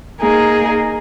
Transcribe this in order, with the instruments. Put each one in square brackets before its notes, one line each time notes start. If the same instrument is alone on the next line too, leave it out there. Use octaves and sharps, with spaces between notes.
[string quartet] A#3 D#4 G#4